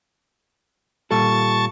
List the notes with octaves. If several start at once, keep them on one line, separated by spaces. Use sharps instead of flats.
A#2 G3 A4 A5 C#6 A6